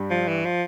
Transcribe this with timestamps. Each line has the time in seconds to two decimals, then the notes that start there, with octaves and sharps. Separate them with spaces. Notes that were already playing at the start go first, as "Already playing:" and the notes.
Already playing: G2 G3
0.10 F3
0.28 E3
0.45 F3